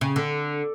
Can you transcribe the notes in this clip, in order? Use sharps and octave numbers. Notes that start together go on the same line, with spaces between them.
C#3
D3